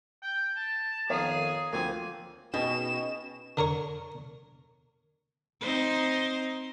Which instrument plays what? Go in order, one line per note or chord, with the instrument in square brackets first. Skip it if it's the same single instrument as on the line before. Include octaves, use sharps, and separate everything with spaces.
[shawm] G5
A5
[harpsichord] F2 D#3 B3 [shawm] G#4 [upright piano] A#4 C#5 F5
[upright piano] D2 F3 [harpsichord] A#3 C4 [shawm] G#5
[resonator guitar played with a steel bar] B2 [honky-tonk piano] C#4 G#4 D#5 [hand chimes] D#4 B4 G5 [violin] E7
[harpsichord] D3 A#4 C#5 C#6
[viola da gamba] C4 D#4 C5